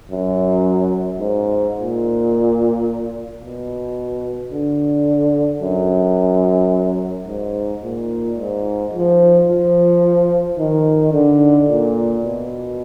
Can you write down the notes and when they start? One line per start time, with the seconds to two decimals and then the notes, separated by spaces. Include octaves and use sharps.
0.11 F#2
1.20 G#2
1.76 A#2
3.42 B2
4.52 D3
5.61 F#2
7.27 G#2
7.83 A#2
8.38 G#2
8.93 F3
9.48 F3
10.58 D#3
11.13 D3
11.69 A#2
12.24 B2